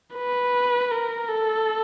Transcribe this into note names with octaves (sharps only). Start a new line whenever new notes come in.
B4
A#4
A4